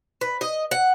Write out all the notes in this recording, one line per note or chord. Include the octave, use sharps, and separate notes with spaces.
B4
D#5
F#5